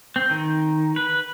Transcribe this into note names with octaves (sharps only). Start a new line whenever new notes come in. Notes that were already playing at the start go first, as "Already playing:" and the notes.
C4
D#3
B4